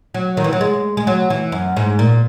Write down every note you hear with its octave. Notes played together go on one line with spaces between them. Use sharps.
F#3
D#3
E3
F#3
G#3
G#3
F#3
E3
F#2
G#2
A#2